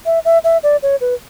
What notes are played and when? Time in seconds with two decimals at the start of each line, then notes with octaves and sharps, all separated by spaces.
0.06 E5
0.25 E5
0.44 E5
0.63 D5
0.83 C#5
1.01 B4